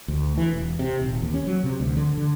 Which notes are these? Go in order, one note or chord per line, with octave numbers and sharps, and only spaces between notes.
D2
E3
E1
C3
D#1
D#2
C#4
F#3
C3
D2
D3
D3